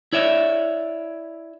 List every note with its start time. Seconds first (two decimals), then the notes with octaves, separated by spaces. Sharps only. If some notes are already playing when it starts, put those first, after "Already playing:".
0.13 E4 C#5 D5 E5